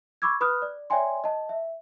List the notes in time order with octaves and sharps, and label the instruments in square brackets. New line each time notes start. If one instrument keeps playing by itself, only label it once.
[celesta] B5 C#6 D6 E6 G#6
B4 B5 D#6 F6 F#6
D5
C#5 D5 E5 G5 G#5 C6
D#5 A5
E5